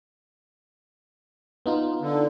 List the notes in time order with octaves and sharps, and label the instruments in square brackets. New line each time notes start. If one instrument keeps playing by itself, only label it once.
[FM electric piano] B3 D#4 F4
[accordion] D3